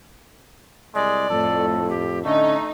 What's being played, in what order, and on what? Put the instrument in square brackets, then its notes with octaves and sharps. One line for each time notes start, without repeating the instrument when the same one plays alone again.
[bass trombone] C2 [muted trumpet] G#3 [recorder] D5
[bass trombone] F2 [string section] A2 [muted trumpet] A4
[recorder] G4
[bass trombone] D3 [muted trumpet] A3 [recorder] C#4 [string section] D#4